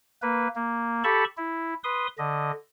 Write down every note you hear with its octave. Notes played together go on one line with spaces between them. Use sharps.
A#3 B4
A#3
G4 A4 A5 B5 C#6
E4
B4 C6 D#6
D3 D#5